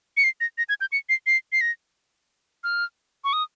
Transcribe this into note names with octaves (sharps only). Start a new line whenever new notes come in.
C#7
C7
A#6
A#6
G#6
G6
C#7
C7
C7
C7
A#6
F6
C#6
D#6